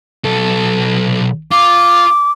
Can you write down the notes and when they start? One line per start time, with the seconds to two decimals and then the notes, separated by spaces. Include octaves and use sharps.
0.25 B1 A4
1.52 F4 D6